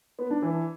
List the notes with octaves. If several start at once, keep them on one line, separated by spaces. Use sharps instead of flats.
B3
D4
E3